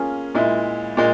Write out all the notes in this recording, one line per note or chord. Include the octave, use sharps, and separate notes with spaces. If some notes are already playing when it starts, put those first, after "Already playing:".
Already playing: A#3 C#4 F4 G#4
A#2 G#3 E4
A#2 G#3